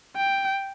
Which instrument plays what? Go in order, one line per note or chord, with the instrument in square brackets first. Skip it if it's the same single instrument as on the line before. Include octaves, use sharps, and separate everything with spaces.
[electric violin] G5